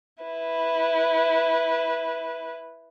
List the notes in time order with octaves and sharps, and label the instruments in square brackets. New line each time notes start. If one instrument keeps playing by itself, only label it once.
[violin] E4 B4